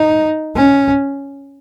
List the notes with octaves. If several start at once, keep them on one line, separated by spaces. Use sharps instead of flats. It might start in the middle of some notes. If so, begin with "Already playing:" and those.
Already playing: D#4
C#4